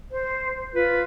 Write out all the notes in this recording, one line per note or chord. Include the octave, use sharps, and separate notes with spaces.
C5
F4 B4